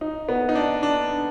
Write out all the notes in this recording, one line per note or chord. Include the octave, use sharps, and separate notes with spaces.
D#4
B3
D#4
D4
D4